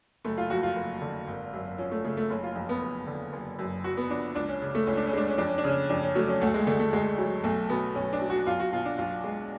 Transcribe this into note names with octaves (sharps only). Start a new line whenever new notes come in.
F#1 A3
F4
F2 F#4
F4
F#1
D3
G#1
F#2
F3 C#4
A3
C#3 A3
A3
F#1 C#4
F4
F2
B3
F#1
D3
F#1
F#2
F#1 F#4
B3
F3 D4
C#2 D4
C#4
C#3
A3
C#2 C#4
D4
C#4
G#3 D4
C#4
F2 D4
C#4
D4
C#3 C#4
F2 D4
C#4
F#3 A3
C#4
D2 A3
G#3
D3 A3
A3
D2 G#3
F#3
B1 A3
B2 B3
B1 C#4
D4
F#3
F#4
B1 F4
F#4
B2 F4
D4
B1 F4
G#3